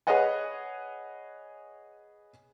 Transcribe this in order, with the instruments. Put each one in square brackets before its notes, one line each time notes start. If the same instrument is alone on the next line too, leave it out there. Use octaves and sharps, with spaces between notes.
[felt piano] G#4 B4 C#5 D#5 F#5 G#5